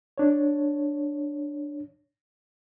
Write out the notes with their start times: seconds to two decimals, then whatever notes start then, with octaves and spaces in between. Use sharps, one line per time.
0.18 D4 C#5